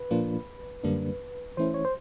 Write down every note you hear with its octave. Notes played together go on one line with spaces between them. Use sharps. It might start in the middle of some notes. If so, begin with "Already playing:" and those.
Already playing: B4
A#2 F3 A#3 D4 F4
F#2 D3 G3 A#3 D4
E3 A3 C#4 E4 C5
C#5
C5